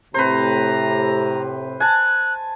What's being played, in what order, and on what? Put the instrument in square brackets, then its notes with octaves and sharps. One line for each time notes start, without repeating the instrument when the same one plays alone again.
[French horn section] A2 C3 [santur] B4 C5 [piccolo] A#5
[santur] G#5 A5 [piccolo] F#6